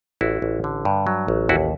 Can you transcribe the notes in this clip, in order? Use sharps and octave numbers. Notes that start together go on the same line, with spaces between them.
A1 E4 F#4
A1
D3
G2
F#3
A1
D#2 E4 F#4